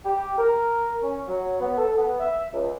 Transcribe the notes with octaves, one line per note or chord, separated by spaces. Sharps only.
G4
A#4
C#4
F#3
B3
A4
B3
E5
C#2